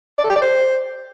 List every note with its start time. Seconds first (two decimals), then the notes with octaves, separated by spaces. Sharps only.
0.18 D5
0.24 A4
0.30 G4
0.36 D5
0.42 C5